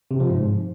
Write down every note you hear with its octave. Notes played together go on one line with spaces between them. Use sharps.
C3
F3
G#2